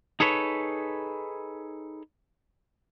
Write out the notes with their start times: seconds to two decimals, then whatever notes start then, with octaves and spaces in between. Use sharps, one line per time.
0.20 D#4 G#4 A4 B4 C#5